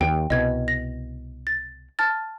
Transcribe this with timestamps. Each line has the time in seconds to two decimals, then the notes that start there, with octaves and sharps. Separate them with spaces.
0.01 D#2 G5
0.30 C2 B2 D#5 G#6
0.68 A#6
1.47 A6
1.99 A5 F6 A6